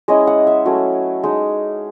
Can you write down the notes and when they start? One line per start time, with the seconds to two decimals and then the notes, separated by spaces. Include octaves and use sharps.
0.08 G#3 C#4 E4 D#5
0.27 F#5
0.47 E5
0.66 F#3 A3 C#4
1.24 G#3 D#4